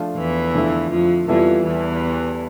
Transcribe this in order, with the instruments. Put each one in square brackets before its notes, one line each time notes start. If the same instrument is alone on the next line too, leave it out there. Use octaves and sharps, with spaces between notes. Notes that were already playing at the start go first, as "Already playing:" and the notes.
Already playing: [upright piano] F3 A3 D4 F4
[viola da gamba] E2 E3
[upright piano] D3 F3 A3 E4
[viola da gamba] F2 F3
[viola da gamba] F2 F3 [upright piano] E3 G3 B3 E4 A4
[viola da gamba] E2 E3